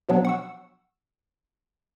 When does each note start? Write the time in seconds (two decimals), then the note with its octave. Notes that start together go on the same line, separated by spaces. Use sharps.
0.09 B2 F3 F#3 B3 D4
0.25 F#5 C#6 E6